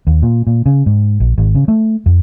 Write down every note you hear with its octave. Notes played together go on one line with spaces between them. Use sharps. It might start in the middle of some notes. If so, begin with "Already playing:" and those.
D#2
A#2
A#2
C#3
G#2
A#1
G#1
C#3
A3
F2